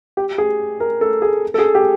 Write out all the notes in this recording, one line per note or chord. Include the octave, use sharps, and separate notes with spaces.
G4
G#4
A#4
A4
G#4
A4
G#4
G4